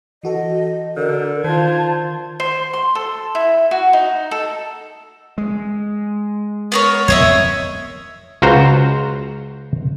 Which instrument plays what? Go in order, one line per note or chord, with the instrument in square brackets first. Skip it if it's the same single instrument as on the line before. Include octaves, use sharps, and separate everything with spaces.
[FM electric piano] E3 F#4 A4 [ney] D#5
[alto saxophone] D3 [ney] A#4
[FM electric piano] D#3 [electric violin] F4 G#6 [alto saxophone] C5 [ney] A5
[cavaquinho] C5
C6
A4
E4
F#4
D#4
A4
[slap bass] G#3
[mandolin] B3 A#4 C#5
[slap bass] F2 B3 [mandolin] C#5 D#5 E5
[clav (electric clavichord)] C#2 F4 F#4 C5 A#5